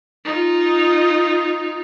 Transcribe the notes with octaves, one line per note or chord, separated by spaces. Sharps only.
D#4 F4